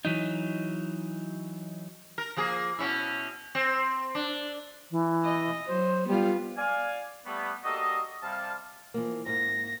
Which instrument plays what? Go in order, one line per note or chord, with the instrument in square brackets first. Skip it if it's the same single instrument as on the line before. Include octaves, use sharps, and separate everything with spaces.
[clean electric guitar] E3 F#3 D#4
[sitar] A#4
F3 A#3 G#4
B2 C#4 E4
C4
D4
[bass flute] E3
[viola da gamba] D#5
[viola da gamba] F#3 [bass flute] C5
[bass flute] G3 [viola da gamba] B3 F4
[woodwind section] D5 F5 G#5
G3 A3 B3
G3 A#3 F#4 A4 D#5
C3 G3 F5 A5
[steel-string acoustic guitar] E3 F3 A#3
[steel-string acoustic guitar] G#2 A#3 [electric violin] A#6